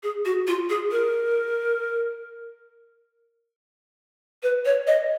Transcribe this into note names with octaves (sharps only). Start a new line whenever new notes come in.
G#4
F#4
F4
G#4
A#4
B4
C#5
D#5